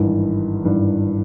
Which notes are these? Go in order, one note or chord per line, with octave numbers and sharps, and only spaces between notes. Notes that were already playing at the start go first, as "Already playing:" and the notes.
Already playing: G#1 G2 E3
G#1 G2 E3